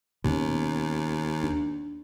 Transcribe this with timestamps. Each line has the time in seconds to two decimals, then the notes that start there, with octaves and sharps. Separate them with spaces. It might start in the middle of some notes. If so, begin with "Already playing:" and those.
0.24 D#2 B2 B3 C#4
1.43 D4